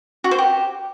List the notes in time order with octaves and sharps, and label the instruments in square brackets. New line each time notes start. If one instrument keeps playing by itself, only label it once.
[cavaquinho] F#4
C5
G4